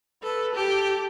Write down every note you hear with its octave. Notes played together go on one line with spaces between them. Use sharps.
A4 B4
G4 A4